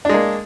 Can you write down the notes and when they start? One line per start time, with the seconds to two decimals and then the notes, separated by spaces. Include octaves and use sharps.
0.05 D4
0.09 G#3
0.14 A#3